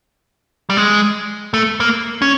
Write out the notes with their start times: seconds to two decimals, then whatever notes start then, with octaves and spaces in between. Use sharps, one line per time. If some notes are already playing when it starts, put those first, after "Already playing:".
0.70 G3
0.77 G#3
1.54 A3
1.80 A#3
2.22 C#4